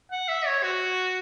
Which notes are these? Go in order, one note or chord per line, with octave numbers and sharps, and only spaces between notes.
F#5
E5
C#5
F#4